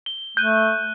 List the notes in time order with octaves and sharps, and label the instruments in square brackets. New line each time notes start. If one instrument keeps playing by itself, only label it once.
[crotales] G7
[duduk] A3 [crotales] F#6 D#7 [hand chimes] G6